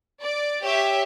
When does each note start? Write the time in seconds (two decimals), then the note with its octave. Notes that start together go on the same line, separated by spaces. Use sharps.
0.24 D5
0.66 G4 C#5 E5